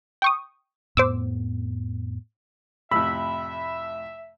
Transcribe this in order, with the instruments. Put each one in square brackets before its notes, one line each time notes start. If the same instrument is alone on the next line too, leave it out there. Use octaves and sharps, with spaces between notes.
[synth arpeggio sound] G5 C#6 D#6
[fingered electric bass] F2 A2 B3 [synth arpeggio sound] C5 D6 E6
[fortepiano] F2 A2 C3 [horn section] E5 [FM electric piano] B5 [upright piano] E6